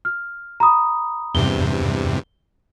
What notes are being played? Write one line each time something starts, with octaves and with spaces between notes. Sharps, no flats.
F6
A#5 B5 D#6
E2 G2 C3 G7